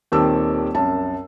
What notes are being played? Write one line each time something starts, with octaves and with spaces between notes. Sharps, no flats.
D#1 D#3 C4 G4 A5 E6
C2 F#2 A5